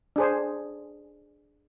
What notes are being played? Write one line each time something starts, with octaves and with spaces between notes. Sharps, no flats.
D4 G#4 C5